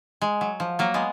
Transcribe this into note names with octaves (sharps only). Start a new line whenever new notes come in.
G#3
F#3
F3
F#3 A#3
G#3 B3